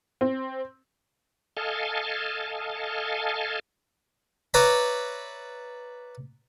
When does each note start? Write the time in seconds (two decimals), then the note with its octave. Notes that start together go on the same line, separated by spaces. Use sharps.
0.21 C4
1.57 A4 D#5 F5 G#5 A5
4.54 B4 C#5 D5 E5 A#5 B5